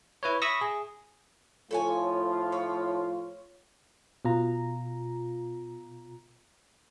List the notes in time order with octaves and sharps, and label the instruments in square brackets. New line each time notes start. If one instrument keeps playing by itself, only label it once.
[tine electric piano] E4 B4 C#5
E5 B5 C#6 D#6 E6 A#6
G#4
[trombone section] A2 F3 F4 [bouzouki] A4 C#5 G#5
[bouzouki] C#5
[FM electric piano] B2 F4 A#5